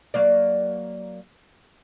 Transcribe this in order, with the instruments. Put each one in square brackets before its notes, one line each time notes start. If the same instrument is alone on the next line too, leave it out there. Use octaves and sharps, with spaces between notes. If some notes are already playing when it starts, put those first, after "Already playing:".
[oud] F#3 A#3 D5